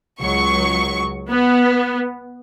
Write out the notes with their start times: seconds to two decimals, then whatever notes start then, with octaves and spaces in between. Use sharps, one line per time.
0.21 C#2 F#3 C#6
1.28 B3